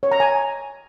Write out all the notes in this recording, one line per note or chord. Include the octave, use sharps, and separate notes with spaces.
C#5
A#5
G#5